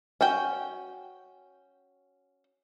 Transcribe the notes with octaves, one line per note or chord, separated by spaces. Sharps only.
C#4 F#4 G5